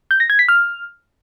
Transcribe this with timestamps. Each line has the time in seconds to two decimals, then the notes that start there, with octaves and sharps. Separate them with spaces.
0.11 G6
0.20 A#6
0.30 G#6
0.39 B6
0.48 F6